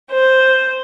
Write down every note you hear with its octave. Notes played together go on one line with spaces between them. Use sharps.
C5